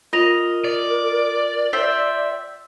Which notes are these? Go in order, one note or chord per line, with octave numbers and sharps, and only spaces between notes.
F4 A#4 D#5 A#6 F7
D5
C5 E5 G5